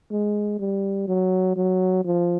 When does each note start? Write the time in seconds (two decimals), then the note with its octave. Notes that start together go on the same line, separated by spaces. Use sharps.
0.11 G#3
0.59 G3
1.08 F#3
1.56 F#3
2.05 F3